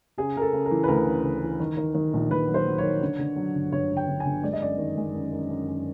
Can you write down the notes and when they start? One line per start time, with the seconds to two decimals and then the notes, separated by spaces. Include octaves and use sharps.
0.18 C#3 G#4
0.36 C#3 A#4
0.42 A4
0.53 C#3
0.66 A#4
0.71 E3
0.84 B4
0.88 D2 A#4
1.07 C#3
1.24 D2
1.42 E3
1.60 D#3
1.77 D#3
1.94 D#3
2.13 A#1
2.31 A#1 B4
2.48 F#3
2.54 C5
2.67 F#3
2.78 D#3 C#5
3.02 D3
3.19 D3
3.36 F#3
3.55 G1
3.72 G1 C#5
3.90 D3
3.97 G5
4.08 G1
4.20 G#5
4.26 G1
4.43 G#3 D5
4.53 D#5
4.62 F#2 D5
4.78 D#3
4.97 G#3
5.15 F#2
5.32 F#2
5.50 F#2
5.68 F#2